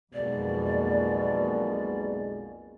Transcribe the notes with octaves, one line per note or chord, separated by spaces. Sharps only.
B1 F2 B2 G#3 A#3 D5